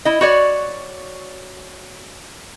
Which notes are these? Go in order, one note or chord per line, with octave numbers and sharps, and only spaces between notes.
E4 D#5
F#4 C#5 D5